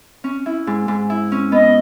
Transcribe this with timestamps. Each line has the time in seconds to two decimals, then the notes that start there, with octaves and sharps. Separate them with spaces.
0.24 C#4
0.46 E4
0.67 G#2
0.88 G#2
1.10 E4
1.32 C#4
1.52 B3 D#5